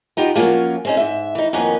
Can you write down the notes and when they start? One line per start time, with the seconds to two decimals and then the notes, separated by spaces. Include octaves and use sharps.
0.17 B3 D#4 F4 G4
0.35 F3 F#3 A#3 C#4 F4
0.85 C4 C#4 D#4
0.97 G#2 E5
1.35 E3 D#4
1.53 F2 D#3 A#3 B3 C#4